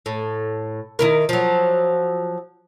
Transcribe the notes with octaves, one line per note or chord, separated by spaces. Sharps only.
A2
D#3 E4 A#4
F3 F#3